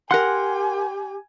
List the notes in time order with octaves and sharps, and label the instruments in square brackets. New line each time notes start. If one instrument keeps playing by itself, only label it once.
[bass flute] G4 [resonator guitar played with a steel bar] A#4 F#5 [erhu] G#5 [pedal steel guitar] C6 F#6